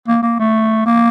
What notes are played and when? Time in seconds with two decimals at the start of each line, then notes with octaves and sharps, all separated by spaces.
0.08 A#3
0.23 A#3
0.40 A3
0.86 A#3